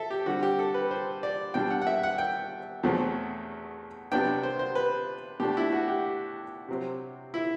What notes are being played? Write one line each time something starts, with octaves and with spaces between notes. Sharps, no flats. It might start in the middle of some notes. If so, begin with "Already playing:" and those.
Already playing: A4 E5
G4
D3 G3 C4 F#4
G4
A4
B4
C5
D5
B2 G3 D4 G5
F#5
F#5
E5
F#5
G5
E2 B2 F#3 A3 C4
C3 F#3 B3 D4 G5
C5
C5
B4
B2 A3 D4 G4
E4
F#4
G4
C3 F#3 C4
E4